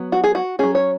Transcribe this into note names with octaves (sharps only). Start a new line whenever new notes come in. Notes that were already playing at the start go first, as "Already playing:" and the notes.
Already playing: F#3 B3
F#4
G#4
F#4
F#3 C#4 G#4
C#5